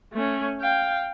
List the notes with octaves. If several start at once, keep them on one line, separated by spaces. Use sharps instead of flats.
A3 C#4
F5 G5